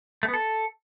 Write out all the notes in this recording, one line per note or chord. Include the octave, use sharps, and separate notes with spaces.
A3
B3
A4